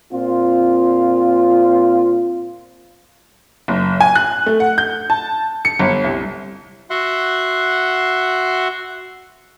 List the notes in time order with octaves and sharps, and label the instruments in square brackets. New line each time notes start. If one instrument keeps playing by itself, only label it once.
[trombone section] A#2 C4 F4
[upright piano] F#1
G#5
F#6
A3
F#5
G6
A5
C#7
G1
C2
[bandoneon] F#4 E5 F#5 C6